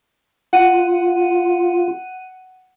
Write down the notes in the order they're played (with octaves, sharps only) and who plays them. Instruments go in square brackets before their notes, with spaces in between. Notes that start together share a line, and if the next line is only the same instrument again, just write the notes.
[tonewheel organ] F4 [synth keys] F#5 D#7